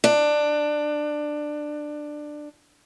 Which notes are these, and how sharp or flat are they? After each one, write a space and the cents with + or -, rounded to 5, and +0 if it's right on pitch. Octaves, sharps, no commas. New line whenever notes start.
D4 +15